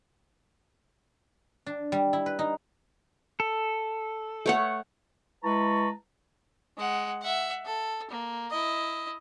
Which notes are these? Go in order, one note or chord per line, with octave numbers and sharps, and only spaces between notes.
D4
G3
E4
B4
D#4
A4
A3 C#5 F#5
G#3 E4 B4 A5 A#5 C#6
G#3 F#5
E5 F#5
A4
A#3
E4 D#5